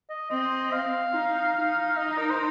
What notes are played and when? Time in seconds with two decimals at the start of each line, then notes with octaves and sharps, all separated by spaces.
0.10 D#5
0.31 C4 D#5
0.73 F5
1.14 D#4
1.55 D#4
1.97 D#5
2.18 A#4
2.30 C5